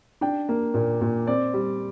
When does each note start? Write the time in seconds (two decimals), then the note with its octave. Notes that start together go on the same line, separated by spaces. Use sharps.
0.21 D4 G5
0.49 A#3
0.74 A#2
1.01 A#2
1.27 C4 D5
1.54 G3